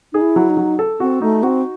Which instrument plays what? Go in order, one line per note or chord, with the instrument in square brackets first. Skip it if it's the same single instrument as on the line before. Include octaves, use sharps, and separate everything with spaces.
[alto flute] D#4 [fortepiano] G#4
[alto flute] E4
[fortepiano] F#3
[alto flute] D#4
[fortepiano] F#3
A4
[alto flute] C4 [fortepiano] F#4
[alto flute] A3 [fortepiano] D#4
[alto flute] C4 [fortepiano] F#4